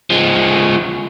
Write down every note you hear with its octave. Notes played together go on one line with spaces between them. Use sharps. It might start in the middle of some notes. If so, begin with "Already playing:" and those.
F3 G#3